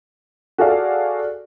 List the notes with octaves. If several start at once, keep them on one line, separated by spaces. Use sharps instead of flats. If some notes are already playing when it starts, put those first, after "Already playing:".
F#4 G#4 A4 D5 F5